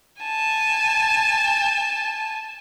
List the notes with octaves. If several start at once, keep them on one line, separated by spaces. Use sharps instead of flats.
G#5 A5